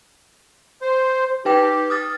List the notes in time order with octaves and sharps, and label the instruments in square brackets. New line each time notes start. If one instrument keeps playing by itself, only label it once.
[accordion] C5
[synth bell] D#4 B4 G5 [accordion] G4
[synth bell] D#6 F6 A6